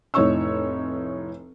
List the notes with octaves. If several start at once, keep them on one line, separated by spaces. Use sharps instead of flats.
F1 A2 D#4 C#5 C#6 E6